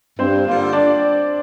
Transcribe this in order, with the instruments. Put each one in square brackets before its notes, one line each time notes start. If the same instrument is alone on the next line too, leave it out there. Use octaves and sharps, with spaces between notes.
[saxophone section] G2 [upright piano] C4 C5
[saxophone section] D3 G3 A#3 F4
[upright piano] D4 D5